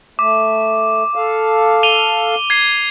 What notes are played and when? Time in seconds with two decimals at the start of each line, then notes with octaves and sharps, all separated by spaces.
0.19 A3 D6
1.16 A4 F5
1.83 D#7 F7 G7
2.50 G#6 C7